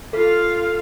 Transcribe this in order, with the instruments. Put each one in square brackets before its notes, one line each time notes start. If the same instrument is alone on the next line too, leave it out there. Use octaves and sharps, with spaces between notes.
[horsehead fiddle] F4 F5 [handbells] A4